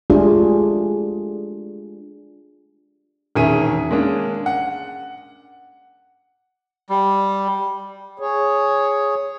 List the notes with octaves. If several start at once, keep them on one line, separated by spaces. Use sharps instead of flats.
G#3 A3 D4 F4 G4 G#4
E1 D#3 C#4 G#4 E5 D#7
G#3 A#3 C#4 D4
F#5
G3
G#4 C#5